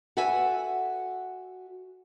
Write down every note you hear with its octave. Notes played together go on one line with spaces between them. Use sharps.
F#4 A4 B4 E5 F#5 G#5